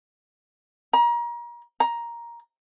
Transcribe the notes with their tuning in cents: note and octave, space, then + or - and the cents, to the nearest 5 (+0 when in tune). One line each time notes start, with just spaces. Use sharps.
A#5 +30
A#5 +10